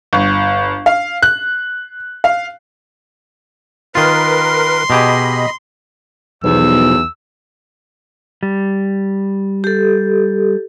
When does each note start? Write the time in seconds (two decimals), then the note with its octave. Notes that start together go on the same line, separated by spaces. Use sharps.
0.13 G1
0.86 F5
1.22 F#6
2.24 F5
3.95 D#3 F4 A#4 B4 C6
4.90 B2 G4 G#4 D#5 B5
6.44 B1 E2 B2 E3 F3 E6
8.43 G3
9.64 G4 A4